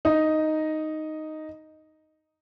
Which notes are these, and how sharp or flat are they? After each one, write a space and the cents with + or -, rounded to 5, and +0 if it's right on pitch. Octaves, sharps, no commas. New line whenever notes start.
D#4 +0 D#5 +0